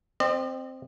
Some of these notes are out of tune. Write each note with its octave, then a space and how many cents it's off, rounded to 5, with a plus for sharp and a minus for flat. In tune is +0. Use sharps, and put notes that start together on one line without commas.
C4 +0 D#5 -40